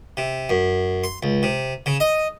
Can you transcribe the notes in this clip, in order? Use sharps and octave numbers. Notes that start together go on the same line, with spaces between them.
C3
F#2
C6
C#2
C3
C#3
D#5